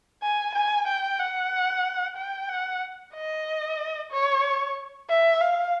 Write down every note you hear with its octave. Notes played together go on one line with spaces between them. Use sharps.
G#5
G#5
G5
F#5
G5
F#5
D#5
C#5
E5
F5